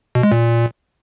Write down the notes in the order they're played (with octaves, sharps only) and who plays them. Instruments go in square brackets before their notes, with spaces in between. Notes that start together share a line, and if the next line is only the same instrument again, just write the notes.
[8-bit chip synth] B2
G#3
A#2